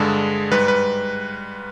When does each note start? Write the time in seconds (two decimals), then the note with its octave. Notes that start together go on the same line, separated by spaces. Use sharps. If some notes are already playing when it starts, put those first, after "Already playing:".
Already playing: G2 D3 G#3 G#4
0.52 G#2 G3 B4
0.68 B4